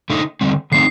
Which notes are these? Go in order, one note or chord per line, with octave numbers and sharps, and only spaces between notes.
D3 A3 D#4
D3 G3 C4
D3 A3 C4 D#4 C7